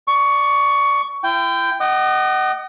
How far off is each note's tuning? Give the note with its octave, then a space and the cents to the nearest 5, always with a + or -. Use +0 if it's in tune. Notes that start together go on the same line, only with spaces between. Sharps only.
D5 +0 C#6 +15
E4 +45 G5 +0
D#5 -10 F#5 +35 D6 +30